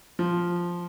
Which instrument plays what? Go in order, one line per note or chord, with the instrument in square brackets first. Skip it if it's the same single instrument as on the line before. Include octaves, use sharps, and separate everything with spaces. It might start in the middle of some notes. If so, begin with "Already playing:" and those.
[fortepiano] F3